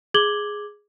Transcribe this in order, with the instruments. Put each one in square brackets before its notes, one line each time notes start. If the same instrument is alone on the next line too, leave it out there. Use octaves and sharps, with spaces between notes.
[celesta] G#4 D6 G#6 F#7 G7